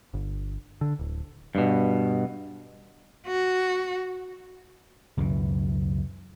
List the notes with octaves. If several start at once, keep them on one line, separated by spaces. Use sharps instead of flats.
G1
D3
D1
G2 B2
F#4
C#2 F#2 B2 E3